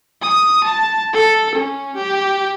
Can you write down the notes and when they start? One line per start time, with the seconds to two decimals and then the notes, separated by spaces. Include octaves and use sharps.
0.22 D#6
0.64 A5
1.13 A4
1.55 C#4
1.96 G4